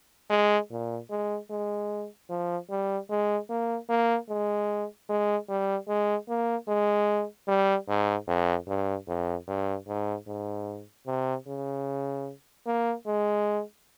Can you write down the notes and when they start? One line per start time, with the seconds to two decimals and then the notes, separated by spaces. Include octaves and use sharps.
0.30 G#3
0.71 A#2
1.10 G#3
1.50 G#3
2.29 F3
2.70 G3
3.10 G#3
3.50 A#3
3.89 A#3
4.29 G#3
5.09 G#3
5.49 G3
5.88 G#3
6.28 A#3
6.68 G#3
7.48 G3
7.88 G#2
8.28 F2
8.67 G2
9.08 F2
9.48 G2
9.87 G#2
10.27 G#2
11.07 C3
11.47 C#3
12.66 A#3
13.06 G#3